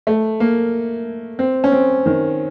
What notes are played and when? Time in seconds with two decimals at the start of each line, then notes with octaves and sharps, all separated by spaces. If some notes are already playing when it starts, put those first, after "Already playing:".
0.07 A3
0.40 A#3
1.39 C4
1.64 C#4
1.72 C4
2.06 D#3